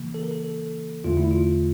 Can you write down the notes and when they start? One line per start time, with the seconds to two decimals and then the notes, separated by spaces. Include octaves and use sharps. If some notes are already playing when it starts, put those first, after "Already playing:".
Already playing: C#3 E3 A#3
0.14 A4
0.23 A#4
0.31 A4
0.45 A4
1.04 E2 D3 A3 F4
1.17 E4
1.31 F4